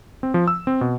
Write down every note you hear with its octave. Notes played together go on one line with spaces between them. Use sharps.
C4
F3
E6
C4
B2